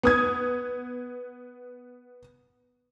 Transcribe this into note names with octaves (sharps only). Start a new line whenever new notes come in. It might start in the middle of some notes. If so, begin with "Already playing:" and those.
B3 D#6 G#6